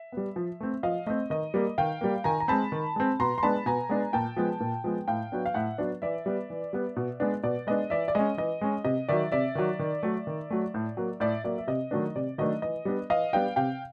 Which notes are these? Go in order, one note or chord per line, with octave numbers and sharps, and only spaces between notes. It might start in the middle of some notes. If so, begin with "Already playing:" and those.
Already playing: E5
G3 B3
F3
A3 C4
F3 D#5 F5
A3 C4 D#5
D#3 D#5
G3 A#3
D#3 F5 G5
G3 A#3
D#3 G#5 A#5
A#5
G#3 C4 A5 B5
D#3
G#3 C4
B2 A#5 C6
C6
G#3 B3 D4 A5 B5
B2 G#5 A#5
G#3 B3 D4
A#2 G5 A5
F3 G#3 B3
A#2
F3 G#3 B3
A2 F5 G5
F#3 B3 D4
F5
A2 E5 F#5
F#3 B3 D4
E3 D5 E5
G3 B3
E3
G3 B3
B2
G#3 B3 D4
B2 D5
G#3 B3 D4 D#5
E3 D5 E5
D5
G#3 C#4 D#5
E3 D#5
G#3 C#4
C3 D#5
D#3 F#3 D5 E5
C3 D5 E5
D#3 F#3
D#3
F#3 A3
D#3
F#3 A3
A2
F#3 A#3
A2 D5 E5
F#3 A#3 D5 E5
E5
C3 D#5
D#3 F#3 A3 D4
C3 D5
D#3 F#3 A3 D4 D#5
E3 D#5
G3 B3 D4
E3 D#5 F5
G3 B3 D4 F5 G5
C3 F5 G5